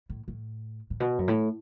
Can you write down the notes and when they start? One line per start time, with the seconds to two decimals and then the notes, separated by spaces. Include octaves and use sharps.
0.10 A2
0.28 A2
0.90 A2
1.00 B2
1.19 F#2
1.28 A2